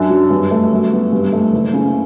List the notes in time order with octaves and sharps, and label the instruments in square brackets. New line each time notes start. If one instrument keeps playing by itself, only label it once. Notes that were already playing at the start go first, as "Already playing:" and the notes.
Already playing: [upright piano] F#2 D4
F#3
G2
A3
F#2
B3
G2
A3
F#1
C#3